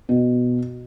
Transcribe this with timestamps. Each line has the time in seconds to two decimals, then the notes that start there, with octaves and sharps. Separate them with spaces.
0.09 B2